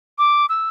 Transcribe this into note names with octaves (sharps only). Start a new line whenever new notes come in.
D6
E6